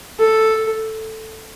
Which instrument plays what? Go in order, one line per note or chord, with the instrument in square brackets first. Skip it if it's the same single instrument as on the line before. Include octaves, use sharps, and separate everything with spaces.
[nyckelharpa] A4